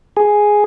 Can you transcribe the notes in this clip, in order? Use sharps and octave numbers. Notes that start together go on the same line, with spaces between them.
G#4